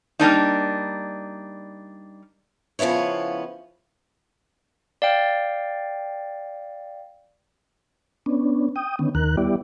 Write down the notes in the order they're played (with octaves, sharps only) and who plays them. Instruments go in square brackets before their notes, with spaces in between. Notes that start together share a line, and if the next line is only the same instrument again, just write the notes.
[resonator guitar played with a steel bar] G3 A#3 D4 D#4
[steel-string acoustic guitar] C#3 F3 B3 E4 C#5
[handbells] D5 F5 G5
[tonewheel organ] B3 C#4 D4
G5 D#6
D3 D#3 B3 C#4
D#2 D#3 A#4 F#6
G3 B3 E4 G4 D5